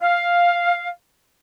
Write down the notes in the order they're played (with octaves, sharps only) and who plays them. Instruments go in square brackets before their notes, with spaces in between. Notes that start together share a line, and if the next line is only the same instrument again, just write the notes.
[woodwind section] F5